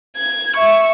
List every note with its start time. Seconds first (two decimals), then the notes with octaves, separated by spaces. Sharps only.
0.17 G#6
0.56 E5 C#6